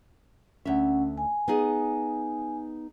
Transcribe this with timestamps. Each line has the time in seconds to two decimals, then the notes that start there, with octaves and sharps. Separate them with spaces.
0.66 D2 C#4 E5 F#5
1.18 G#5
1.48 B3 D#4 G#4